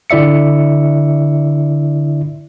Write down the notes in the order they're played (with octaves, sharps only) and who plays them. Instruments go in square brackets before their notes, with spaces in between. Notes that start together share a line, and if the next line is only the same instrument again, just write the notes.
[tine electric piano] D3 E4 D5 E5 C#7